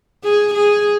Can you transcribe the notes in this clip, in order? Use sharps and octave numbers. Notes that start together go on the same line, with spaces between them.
G#4
G#4